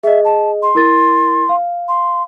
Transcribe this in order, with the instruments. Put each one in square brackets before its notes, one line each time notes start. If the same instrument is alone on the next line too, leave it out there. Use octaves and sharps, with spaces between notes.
[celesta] G#4 D#5 [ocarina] E5
[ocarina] A5
C6
[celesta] E4 A#4 A6
F5
[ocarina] C6